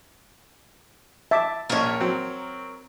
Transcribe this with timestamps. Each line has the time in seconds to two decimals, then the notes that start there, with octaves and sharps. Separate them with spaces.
1.31 E5 A5 D6
1.70 A#1 A#2 A#4 C#5
2.00 F#3 C4